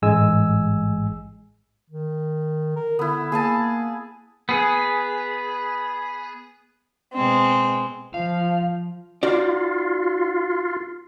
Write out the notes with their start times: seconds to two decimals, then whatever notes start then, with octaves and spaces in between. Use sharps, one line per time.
0.02 A1 G#2 G#3 G#5 E6
1.90 D#3
2.76 A#4
2.99 D3 B3 E4
3.32 A#3 G#4 G#5 A5
4.49 B3 G#4
7.15 B2 G#3 C4
8.14 F3 F5
9.23 D#4 F4 F#4 D5